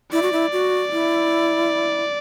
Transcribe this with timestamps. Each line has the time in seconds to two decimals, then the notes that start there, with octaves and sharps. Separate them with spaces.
0.12 E4 D5
0.22 F#4
0.32 E4
0.52 F#4
0.92 E4